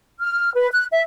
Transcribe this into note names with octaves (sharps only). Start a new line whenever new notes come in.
F6
B4
F#6
E5